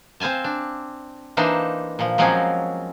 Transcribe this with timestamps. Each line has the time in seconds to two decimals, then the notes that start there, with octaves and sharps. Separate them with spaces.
0.20 C4 C5 F5 G#5 A5
0.44 D4
1.37 E3 A#3 D4 D#4 C5
1.99 A#2 F3
2.18 F3 F#3 G#3 A#3 C4 C#4